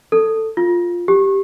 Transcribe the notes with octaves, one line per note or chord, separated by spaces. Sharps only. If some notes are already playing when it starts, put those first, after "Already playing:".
A4
F4
G4